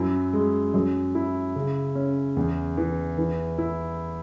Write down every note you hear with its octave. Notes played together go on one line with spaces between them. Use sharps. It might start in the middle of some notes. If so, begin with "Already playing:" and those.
Already playing: F#2 E4
G#3
F#2
E4
C#3
C#4
E2
E3
E3
E4